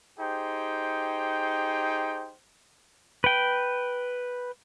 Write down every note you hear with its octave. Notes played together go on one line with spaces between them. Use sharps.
D#4 G4 G#4 C5 G5
B4 G5